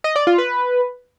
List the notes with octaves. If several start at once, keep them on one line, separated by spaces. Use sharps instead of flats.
D#5
D5
F4
B4